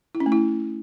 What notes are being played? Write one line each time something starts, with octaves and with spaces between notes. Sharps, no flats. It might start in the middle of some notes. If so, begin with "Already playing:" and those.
E4
C#4
A3
E4